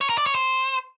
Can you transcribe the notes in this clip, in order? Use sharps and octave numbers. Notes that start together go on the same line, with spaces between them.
C#5
A#4
D5
C#5
C5